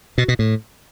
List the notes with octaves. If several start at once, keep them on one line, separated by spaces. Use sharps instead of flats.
B2
B2
A2